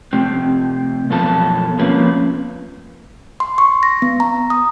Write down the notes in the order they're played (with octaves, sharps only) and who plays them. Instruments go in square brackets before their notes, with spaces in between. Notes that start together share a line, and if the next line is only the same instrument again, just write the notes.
[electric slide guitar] C3 A3 C4
F#2 B2 F3 B3 A4 A5
F3 A3 A#3 C4 C#4 B4
[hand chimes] C6
C#6
A#6
B3
A#5
D#6